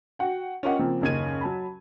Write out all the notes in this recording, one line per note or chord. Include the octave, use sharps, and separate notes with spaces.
F#4 F#5 G5
C#4 F4 G4 A#4 D#5 F#5
C#3 F3 A#3 C4
F#1 D#2 C#3 D#5 G#6 D#7
F#3 A5 B5